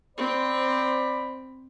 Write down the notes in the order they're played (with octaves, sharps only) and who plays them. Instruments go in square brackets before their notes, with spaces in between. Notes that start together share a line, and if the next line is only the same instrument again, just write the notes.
[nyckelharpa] C4 [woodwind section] C5 D5 B5